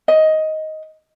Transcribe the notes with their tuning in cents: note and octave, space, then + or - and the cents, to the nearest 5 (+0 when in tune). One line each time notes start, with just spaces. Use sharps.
D#5 +10